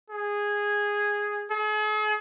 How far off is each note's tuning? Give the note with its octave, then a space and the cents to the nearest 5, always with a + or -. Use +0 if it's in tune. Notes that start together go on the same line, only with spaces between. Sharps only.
G#4 -10
G#4 +45